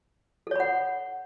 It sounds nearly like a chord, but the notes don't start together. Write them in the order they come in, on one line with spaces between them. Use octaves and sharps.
A4 C#5 B5 F#5